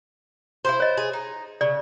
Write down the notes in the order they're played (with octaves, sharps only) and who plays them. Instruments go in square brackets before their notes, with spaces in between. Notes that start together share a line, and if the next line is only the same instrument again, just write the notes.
[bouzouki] E4 G4 C5
[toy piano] C#5 D#5
[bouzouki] G#4
D#4
[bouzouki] C#3 [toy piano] D5